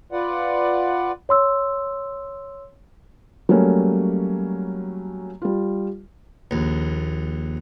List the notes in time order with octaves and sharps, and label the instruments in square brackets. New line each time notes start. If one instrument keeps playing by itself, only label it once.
[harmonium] F4 B4 D5 F#5
[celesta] C#5 C6 E6
[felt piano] F#3 G3 A3 A#3 C#4
G3 F4
[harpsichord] A#1 D#2